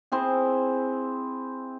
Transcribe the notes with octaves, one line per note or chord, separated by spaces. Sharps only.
C4 E4 G#4